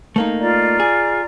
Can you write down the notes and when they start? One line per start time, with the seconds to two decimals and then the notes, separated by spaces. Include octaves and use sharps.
0.16 A3 A#3 D#4
0.39 F4 D5 A#5
0.80 G#4